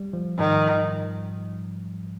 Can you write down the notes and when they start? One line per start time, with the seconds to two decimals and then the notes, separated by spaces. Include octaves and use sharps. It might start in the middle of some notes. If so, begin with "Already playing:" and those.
Already playing: G3
0.13 F3
0.39 G#2 D#3